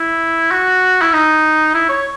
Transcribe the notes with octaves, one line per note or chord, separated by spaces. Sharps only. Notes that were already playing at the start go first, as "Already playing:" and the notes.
Already playing: E4
F#4
E4
D#4
E4
C#5